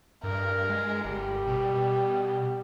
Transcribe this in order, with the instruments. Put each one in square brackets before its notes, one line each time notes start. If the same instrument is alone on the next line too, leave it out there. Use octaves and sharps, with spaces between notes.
[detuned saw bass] G2 [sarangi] A#4
[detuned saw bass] G#3
[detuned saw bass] G1 [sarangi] G3
[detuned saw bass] B2